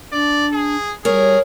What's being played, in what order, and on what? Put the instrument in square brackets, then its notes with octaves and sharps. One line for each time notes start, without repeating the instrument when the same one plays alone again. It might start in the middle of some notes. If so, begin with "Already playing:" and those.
[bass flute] D4 [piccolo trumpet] D5
[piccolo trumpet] G#4
[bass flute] G3 [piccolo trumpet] G#4 [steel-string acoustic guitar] A#4 C#5